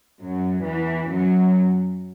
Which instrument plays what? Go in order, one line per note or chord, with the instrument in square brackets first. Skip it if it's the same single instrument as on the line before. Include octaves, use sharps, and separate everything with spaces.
[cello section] F#2 F#3
E2 E3
F#2 F#3